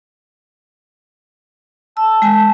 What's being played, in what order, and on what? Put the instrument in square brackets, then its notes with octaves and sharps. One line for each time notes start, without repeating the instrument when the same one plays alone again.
[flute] A5 [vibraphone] E6
[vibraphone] G#3 G#5